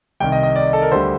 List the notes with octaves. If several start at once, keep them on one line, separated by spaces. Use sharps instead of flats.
C2 C3 D#3 G5
D#5
D#5
D5
A4
A#4
D2 D3 G3 C5